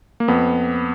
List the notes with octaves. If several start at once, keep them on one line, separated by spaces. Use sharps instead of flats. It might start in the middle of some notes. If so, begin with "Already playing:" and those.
A#3
F2 B3